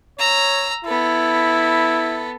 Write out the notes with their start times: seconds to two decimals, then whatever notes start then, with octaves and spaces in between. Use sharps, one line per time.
0.19 C#5 A#5 E6
0.85 B3 E4 A4